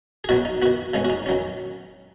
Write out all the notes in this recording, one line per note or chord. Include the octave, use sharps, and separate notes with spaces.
G#4
B2 F#3 B3 F#4
D#4
D#3 B3 F#4
C#3 G#3 B3 C#4
F#4
D#4
D#3 F#3 C#4